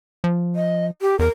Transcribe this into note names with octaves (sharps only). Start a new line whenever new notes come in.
F3
D#5
G4
E2 A#4